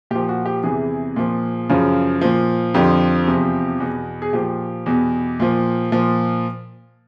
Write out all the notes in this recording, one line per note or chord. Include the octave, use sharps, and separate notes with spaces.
A#2 F3 G4
F#4
G4
E2 C3 E3 G#4
A#2 F3
F#2 C#3 F3
A#2 F3
F2 D3 F3 G4
E2 C3 F3
E2 B2
G#4
A#2 F3 G4
E2 B2
A#2 F3
A#2 F3